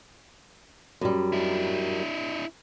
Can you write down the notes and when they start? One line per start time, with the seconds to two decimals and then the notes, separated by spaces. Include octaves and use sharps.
1.01 F#2 G3
1.33 D4 E4